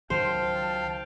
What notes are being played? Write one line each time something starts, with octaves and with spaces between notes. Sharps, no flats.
C#2 D#3 F#3 C5 F5 G5 A5